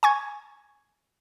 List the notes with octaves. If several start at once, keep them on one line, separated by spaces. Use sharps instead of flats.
G#5 C#6 G#6